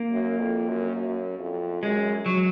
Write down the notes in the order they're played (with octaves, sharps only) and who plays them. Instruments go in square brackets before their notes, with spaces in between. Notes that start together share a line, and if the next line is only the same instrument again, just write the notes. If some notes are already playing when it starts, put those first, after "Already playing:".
Already playing: [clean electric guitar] A#3
[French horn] F#2
F2
F#2
F#2
F2
[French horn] F#2 [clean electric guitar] G#3
[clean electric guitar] F#3